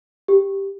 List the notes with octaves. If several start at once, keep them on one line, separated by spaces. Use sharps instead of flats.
G4